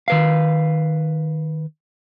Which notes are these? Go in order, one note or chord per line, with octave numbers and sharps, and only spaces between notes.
D#3 B4 F5